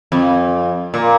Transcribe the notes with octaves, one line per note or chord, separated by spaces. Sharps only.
F2
A#2